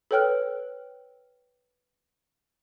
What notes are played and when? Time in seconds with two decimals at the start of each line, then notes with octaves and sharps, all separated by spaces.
0.11 A4 B4 C#5 G5 F6 F#6